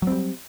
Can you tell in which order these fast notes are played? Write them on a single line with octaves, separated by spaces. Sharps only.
F#3 C4 G3